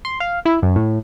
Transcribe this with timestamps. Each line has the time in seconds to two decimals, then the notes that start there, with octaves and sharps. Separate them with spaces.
0.05 C6
0.20 F5
0.45 E4
0.63 F#2
0.76 A2